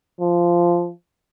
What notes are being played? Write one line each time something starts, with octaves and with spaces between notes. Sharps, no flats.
F3